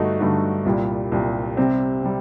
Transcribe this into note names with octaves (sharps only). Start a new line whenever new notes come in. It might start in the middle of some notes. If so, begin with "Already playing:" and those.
Already playing: G2 D3 A3 D#4 F#4
G2 D3 A3 D#4 F#4
C2 A#2 G3
C2 A#2 G3
C3 G3 C4
C3 G3